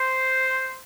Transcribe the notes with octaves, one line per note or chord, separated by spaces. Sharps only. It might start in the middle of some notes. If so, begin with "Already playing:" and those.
Already playing: C5